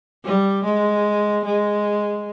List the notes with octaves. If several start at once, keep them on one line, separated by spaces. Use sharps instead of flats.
G3
G#3
G#3